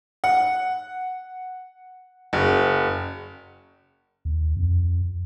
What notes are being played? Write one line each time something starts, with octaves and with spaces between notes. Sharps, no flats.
F#5
F#1
D#2
F2